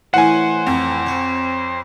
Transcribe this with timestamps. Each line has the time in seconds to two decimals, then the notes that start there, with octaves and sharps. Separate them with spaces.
0.14 A2 E3 C#4 C5 F#5 G#5
0.67 F2
1.06 C#5